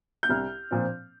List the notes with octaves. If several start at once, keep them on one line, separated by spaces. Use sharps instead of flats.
G6
C2 F6
A#2 F3 C4